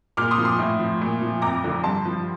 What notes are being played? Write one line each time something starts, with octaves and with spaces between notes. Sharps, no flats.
A#2 D6 F6
C6 D#6
F3
C6 D#6
A2
F3
A#2
F3
F2 A#5 D6
D3 F3
G2 A5 C6
F3